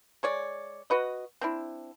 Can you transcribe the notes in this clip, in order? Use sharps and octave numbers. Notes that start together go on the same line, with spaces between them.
G#3 C#5 D5
F#4 B4 D#5
C4 D4 E4